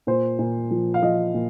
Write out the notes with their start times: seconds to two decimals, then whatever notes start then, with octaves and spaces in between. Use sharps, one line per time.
0.07 A#2 C5
0.39 A#2
0.71 F3
0.94 F5
1.02 F3 D#5
1.34 A#2